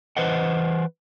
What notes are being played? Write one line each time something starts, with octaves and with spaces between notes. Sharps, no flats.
E3 B4 C5 D#5 F#5